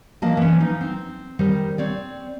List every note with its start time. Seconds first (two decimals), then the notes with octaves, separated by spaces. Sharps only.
0.22 E3 F3 A#3 D#5 A5
0.37 E3 C#4
0.60 F3 D#4
0.81 C4
1.39 D#3 G3 C5
1.78 C4 C#5 D5